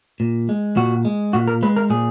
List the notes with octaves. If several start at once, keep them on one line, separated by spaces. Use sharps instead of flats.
A#2
G#3
A#2 F#4
G#3
A#2 F#4
A#4
G#3 B4
A#4
A#2 G#4